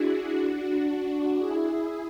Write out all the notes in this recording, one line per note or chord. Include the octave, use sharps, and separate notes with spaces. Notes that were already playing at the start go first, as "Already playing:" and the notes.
Already playing: D4 E4 F#4 G#4
D4 F#4
D4 F#4
E4 G#4